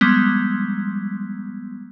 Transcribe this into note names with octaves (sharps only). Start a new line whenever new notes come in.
F3 G3 G#3 B3